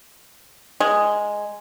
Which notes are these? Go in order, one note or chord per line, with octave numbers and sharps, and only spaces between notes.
G#3